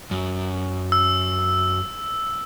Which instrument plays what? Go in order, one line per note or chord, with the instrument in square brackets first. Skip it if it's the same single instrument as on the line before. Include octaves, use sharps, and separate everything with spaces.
[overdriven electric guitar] F#2
[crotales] E6